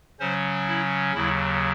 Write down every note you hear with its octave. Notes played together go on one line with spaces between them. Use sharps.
C#3 F#3 C#4 C5
E4
D#2 C#3 F#3 E4